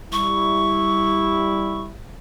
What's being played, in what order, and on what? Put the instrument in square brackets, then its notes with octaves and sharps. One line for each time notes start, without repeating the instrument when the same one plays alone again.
[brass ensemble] G3 E4 [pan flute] C#6